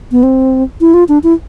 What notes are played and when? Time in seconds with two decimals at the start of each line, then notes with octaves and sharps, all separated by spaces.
0.12 B3
0.23 C4
0.81 E4
0.94 F4
1.09 D4
1.24 E4